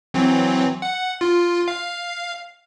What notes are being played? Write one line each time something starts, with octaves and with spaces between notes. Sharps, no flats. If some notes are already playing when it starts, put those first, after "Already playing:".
E3 F#3 C4
F#5
F4
F5